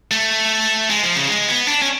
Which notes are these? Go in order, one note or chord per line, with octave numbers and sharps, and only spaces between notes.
A3
G#3
F3
C#3
G#3
B3
D4
C#4